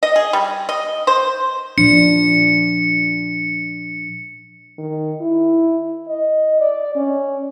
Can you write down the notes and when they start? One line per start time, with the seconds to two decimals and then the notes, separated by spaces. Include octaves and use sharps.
0.03 D#5
0.16 G#4
0.33 G3
0.69 D#5
1.07 C5
1.78 A#2 F3 D4 C#7
4.78 D#3
5.21 E4
6.09 D#5
6.60 D5
6.95 C#4